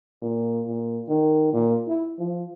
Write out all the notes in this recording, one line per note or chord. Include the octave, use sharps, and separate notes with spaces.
A#2
A#2
D#3
A#2
E4
F3